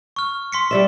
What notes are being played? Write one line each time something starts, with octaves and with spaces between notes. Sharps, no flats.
C#6 F6
C6 B6 C#7
G3 D5 E5